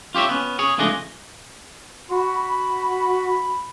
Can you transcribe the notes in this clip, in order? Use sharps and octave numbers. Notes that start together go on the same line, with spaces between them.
F4 G4 C#5 E5
B3 C#4
G#4 C#5
C#2 F3 A3 D4 G#4 D#5
F#4 B5